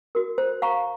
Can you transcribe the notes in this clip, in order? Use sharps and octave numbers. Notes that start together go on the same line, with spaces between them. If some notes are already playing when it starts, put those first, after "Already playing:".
F#4 A#4
C5
F5 A#5 C#6